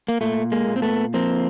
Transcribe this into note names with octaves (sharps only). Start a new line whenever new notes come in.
A#3
A#2 A3
G#3 A#3
A#2
C4
A3 B3
F3 A#3 C4